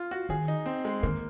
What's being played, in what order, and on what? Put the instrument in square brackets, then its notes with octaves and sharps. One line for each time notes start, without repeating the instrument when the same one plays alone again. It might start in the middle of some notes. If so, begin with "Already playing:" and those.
Already playing: [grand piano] F4
F#4
[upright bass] D#3 [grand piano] G#4
[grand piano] D#4
C4
G#3
[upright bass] D#3 [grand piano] A#3